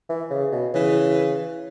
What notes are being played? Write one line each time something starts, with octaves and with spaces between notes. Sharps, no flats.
E3
C#3
B2
C#3 E3